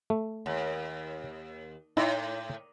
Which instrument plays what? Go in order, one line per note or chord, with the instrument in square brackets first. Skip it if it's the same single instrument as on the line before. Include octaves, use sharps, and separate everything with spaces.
[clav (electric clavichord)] A3
[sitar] D#2
[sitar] A2 [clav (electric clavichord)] D#4 E4